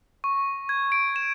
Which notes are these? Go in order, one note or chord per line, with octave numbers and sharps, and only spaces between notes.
C#6
G#6
D7
E7